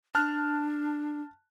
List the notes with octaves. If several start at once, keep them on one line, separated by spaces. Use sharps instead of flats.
D4 A5 F6 F#6